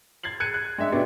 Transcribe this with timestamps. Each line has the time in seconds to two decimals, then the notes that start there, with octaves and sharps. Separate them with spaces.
0.24 G#6 A6 C7 F#7
0.40 F#6 G#6 C#7 D#7
0.54 F#6
0.78 G#3 D4 E5
0.92 B2 B3 D4 G4